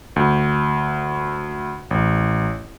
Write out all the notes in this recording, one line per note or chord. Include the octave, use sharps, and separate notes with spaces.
D2
A1